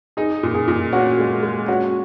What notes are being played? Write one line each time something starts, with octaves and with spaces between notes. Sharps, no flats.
D#4 G#4
A#2
G#4
A#2
C#4 F#4
G#3
G#3
C#4 F#4